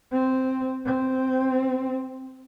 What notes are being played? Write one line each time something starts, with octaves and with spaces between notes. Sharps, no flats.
C4
C4